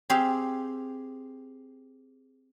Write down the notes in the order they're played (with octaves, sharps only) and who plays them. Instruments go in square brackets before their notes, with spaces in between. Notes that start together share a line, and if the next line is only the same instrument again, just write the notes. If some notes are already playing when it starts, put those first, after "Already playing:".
[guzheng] C4 G4 G#4 F5